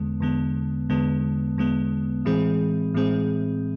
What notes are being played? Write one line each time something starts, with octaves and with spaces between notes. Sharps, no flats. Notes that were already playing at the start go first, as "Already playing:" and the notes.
Already playing: E2 D3 G#3 B3
E2 D3 G#3 B3
E2 D3 G#3 B3
E2 D3 G#3 B3
A2 E3 G#3 C4 G#4
A2 E3 G#3 C4 G#4